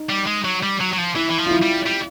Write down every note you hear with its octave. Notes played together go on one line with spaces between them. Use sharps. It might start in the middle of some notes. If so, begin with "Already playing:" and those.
Already playing: D#4
G3
G#3
F#3
G3
F#3
F#3
F3
E3 E4
E3
F3
F4
E4
G3
G3